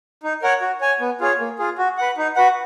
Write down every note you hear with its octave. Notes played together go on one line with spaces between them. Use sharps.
D#4
A#4 C#5 F#5
F#4
C#5 G#5
B3
F4 G#4 C#5
A#3
F4 G#4
F#4
B4 F#5
D#4
F#4 B4 F#5